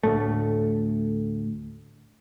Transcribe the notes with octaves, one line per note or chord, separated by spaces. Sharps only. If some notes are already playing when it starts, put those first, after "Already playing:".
D2 A2 A3